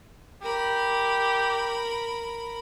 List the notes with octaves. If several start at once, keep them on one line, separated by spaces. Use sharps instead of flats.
G4 A#4 B5